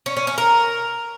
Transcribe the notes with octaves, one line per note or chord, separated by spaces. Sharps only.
C#4
C#4
C#4
A#4